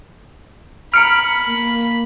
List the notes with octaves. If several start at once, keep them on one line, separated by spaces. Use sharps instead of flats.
A#5 B5 F6 C#7 D7
A#3